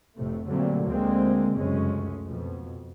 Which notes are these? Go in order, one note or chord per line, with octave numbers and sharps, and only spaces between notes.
F1 A2 C3 A3
A#2 D3 F#3 G3 A3 C4
D2 D3 G#3 A#3 C4
F1 C#2 F#2 G#3 A3 C#4
F2 B2